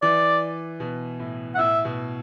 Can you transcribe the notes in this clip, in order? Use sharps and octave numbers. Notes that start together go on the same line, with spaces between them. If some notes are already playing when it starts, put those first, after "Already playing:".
E3 D5
B2
A2
F#5
A2 E5
B2